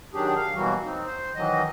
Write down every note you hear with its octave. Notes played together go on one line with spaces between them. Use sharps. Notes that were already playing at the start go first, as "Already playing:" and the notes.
D#3 F#3 D4 G4 G#4
F5
B2 E3 F#3 G3 A#3 F#4
C4 D#4
C5
D#3 E3 F#3 D#5